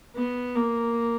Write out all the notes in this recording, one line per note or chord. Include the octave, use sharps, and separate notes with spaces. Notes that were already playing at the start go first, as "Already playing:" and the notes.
B3
A#3